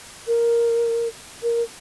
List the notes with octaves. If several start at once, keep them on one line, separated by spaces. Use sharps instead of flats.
A#4
A#4